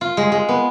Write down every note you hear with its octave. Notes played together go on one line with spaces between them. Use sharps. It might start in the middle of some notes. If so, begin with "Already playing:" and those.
F4
G#3
G#3
B3